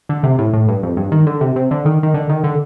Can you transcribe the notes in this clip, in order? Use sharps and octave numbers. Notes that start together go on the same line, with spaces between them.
D3
C3
A2
A2
G2
F2
G2
D#3
D3
C3
C3
D3
D#3
D#3
D3
D#3
D3